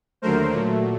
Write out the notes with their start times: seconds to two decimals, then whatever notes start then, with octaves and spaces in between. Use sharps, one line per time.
0.22 D#2 D3 F#3 A3 A#4 C5
0.52 A#2 F#3 A3